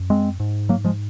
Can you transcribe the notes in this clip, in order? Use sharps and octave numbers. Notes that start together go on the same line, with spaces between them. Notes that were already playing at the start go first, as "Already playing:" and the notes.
Already playing: F#2
G#3 C4
G#2
F#3 A#3
F3 G#3